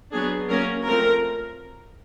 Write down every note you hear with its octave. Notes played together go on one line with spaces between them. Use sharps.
F#3 B3 D4 G#4
F#3 A#3 C#4 A#4
F3 A3 C4 A#4